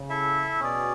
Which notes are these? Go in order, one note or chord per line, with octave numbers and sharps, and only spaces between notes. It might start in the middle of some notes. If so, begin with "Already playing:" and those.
Already playing: C#3
E4 A4 E5
B2 C#4 G#4 D5